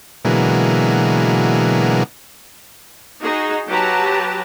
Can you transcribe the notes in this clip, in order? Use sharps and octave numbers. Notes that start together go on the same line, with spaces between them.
B2 D3 E3 F#3 G#3 A#3
D#4 F#4 G#4
F#3 G4 B4 A5 A#5